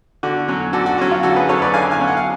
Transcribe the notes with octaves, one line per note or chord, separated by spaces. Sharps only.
D3 F#4
F#3 C#4
D3 F#4 A4
F#4
F#3 C#4 F#4
F4
D3 F#4 A4
G#4 B4
F#3 C#4 A4 C#5
B4 D5
D3 F5 G#5
F5 G#5
F#3 C#4
F#5
F5